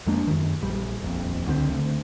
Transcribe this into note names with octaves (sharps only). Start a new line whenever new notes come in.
F2 G#3 A#3 D4
F#2 D#3
A#1 G3
D#1 A#1 F2
C#2 D3 E3 C4
D2